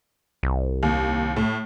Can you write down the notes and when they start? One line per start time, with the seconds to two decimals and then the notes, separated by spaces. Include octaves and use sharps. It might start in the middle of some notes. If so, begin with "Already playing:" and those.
0.43 C2
0.83 D#2
1.37 A2